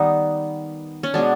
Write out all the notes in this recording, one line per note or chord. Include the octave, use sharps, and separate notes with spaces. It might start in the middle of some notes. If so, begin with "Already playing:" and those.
Already playing: D#3 G3 B3 D#4
C#4
B2 G#3 B3 D4